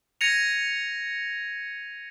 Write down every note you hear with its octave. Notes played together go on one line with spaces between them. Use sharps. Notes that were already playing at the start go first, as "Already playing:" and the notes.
G#6 A#6 C#7 D#7 F7